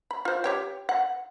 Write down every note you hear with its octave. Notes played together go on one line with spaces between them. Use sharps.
B5
F4 C5
G4 C#5 G5
F#5